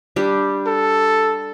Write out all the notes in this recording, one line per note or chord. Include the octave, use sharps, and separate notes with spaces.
G3 D4 G4
A4